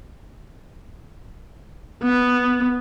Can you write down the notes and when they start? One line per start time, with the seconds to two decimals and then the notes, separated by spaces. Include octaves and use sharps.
2.03 B3